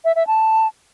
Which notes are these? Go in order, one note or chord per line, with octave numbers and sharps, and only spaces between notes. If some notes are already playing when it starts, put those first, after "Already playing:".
E5
E5
A5